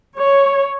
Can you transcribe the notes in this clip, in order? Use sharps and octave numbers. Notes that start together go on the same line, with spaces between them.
C#5